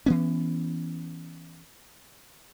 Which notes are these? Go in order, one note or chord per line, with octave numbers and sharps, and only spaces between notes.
E3 B3 C#4